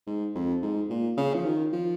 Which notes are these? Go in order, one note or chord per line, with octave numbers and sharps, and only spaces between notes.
G#2
F2
G#2
A#2
C#3
F3
D#3
F3